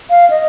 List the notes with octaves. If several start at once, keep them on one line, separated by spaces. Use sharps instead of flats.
F5
D#5